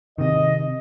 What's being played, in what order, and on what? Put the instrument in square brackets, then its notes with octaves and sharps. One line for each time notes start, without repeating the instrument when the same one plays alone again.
[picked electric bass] C3 D#3 [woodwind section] D#5